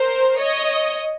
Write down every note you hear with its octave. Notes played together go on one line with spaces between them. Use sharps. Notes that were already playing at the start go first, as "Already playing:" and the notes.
Already playing: A#4 C5
C#5 D#5